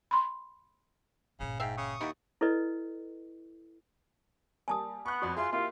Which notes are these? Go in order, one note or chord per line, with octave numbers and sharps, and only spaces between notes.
B5 C6
G1 A#2 C#3
G#2 E5 F5 G5
C#3 C#6 D#6
D#2 D#4 E4 F#4
E4 A4 B4 D5 D#5
G3 A#3 G#5 A5 D#6
B3 C#6 F#6
F2 F#4 D5 D#6
F4 G#4 E5 C6
A#3 E4 F4 G4